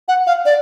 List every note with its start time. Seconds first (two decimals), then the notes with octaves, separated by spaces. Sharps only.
0.08 F#5
0.27 F5
0.45 D5